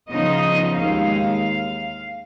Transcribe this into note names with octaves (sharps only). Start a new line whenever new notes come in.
C#3 F3 B3 D#4 D#5
D#2 D#3 G#3 F5